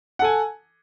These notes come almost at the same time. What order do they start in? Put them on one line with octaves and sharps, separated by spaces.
F#5 A4 G#5